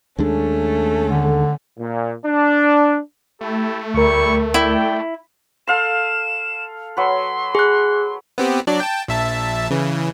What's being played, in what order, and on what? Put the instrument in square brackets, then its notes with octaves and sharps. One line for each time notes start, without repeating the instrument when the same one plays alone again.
[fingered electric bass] D#2 G#3 D4 [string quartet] A3 C#4 A4
[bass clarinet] D3
[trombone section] A#2
D4
[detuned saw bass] A3 [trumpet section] E4 G4 A4
[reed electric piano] D2 A#4 [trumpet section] G3 E4 C#6
[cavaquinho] E4 [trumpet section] D5 G5
[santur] A4 F5 C6 [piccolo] E7
[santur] F#3 B4 [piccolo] C6
[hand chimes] G#4 F#6
[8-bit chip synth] B3 C4 G4
F#3 D4 D5
G5 A5
A#1 E5 A5
C#3 E3